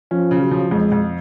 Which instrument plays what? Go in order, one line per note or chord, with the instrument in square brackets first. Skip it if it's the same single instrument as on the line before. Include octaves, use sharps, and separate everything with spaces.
[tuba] F3 [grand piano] C#4
[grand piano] C#3
[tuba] F#3
[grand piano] F3
[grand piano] F2 [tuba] G#3
[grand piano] F2